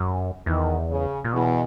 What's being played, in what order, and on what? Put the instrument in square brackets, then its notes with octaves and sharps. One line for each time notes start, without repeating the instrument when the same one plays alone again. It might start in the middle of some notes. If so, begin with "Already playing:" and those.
Already playing: [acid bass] F#2
[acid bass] E2 [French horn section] D#3
[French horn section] C#3
[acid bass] A#2
[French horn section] E2 [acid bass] B2